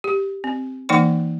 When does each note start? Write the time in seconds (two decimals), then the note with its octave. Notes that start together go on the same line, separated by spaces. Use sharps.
0.04 G4
0.44 C4
0.89 E3 A#3 D#4 D5 G5 C#6